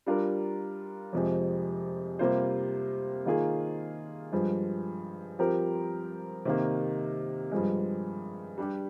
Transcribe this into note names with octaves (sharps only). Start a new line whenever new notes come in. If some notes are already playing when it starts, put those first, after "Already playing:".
G3 D4 F4 A#4
F2 C3 F3 G#3
C3 G3 A#3 F4 C5
D#3 A#3 F4 G#4
G2 F3 G#3
F3 C4 G4 A#4
C3 D#3 A#3
G2 F3 G#3
G3 D4 G4